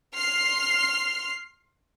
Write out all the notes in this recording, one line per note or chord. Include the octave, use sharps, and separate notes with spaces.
C6 F6 C7